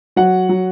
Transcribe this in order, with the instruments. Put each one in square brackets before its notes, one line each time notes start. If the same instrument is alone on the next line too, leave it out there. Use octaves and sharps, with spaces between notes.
[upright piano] F#3 F#5
F#3